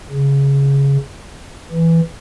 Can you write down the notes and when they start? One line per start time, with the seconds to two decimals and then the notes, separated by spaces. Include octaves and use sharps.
0.11 C#3
1.71 E3